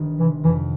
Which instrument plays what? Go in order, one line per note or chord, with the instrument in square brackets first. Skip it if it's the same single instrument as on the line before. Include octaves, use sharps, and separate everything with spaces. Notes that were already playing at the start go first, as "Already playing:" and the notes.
Already playing: [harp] G1 D#3
[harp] C3 [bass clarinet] E3
[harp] F2 [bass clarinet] E3